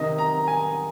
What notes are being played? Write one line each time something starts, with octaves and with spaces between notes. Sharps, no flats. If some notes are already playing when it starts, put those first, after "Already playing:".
Already playing: C3 D#3 D#5
A#5
G#5